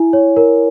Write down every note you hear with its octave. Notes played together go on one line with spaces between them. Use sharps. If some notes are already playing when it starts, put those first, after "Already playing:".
Already playing: E4 G#5
C#5
A#4